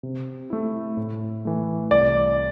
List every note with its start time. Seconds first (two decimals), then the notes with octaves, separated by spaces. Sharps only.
0.03 C3
0.50 A3 E4
0.97 A2
1.45 E3 A3
1.91 C2 D5